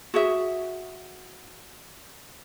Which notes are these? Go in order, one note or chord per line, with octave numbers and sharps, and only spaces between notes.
F#4 G#4 E5